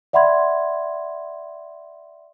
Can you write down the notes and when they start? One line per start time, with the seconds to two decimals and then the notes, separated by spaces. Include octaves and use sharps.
0.13 D5 E5 F#5 B5 C6 G#6